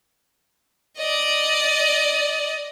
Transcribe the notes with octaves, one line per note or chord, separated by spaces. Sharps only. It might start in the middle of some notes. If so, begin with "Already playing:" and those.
D5 D#5